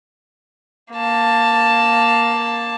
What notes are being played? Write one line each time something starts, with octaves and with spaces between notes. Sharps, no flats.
A#3 A5